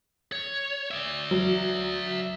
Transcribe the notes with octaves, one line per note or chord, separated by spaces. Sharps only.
C#5
D5 E5
F#3